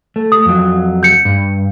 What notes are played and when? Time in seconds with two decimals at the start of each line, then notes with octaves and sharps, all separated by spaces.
0.16 A3
0.32 D#6
0.46 F2 F#3
1.03 G6 C#7
1.25 G2